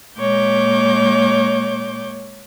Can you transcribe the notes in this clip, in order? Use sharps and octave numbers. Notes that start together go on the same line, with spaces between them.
A#2 G#3 A#3 C#5 D6 G6